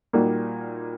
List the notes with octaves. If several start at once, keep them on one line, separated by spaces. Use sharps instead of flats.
A#2 G3 A#3 D#4 F#4